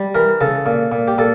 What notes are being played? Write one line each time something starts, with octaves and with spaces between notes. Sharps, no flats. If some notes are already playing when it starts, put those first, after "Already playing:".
Already playing: G3
E3 A#4
C#3 A4
A#2
A#2
G4
A#2 A4